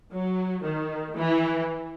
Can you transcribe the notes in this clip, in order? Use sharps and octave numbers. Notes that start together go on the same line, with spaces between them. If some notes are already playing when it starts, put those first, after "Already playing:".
F#3
D#3
E3